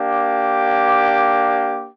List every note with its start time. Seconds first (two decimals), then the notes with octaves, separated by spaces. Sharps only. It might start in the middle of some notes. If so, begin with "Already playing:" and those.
Already playing: A#3 D4 G4